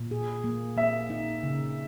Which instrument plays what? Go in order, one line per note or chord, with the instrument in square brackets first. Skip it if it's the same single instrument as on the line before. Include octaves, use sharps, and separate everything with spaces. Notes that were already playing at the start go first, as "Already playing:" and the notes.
Already playing: [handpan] A#2
G#4
A#3
[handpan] A#3 [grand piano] E5
[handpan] D#4
C#3